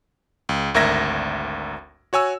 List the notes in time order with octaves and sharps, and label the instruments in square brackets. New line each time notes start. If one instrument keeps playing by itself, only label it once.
[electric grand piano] C#2
G#1 D2 A#4 E5 G#6 A#6
F#4 C#5 G#5 E6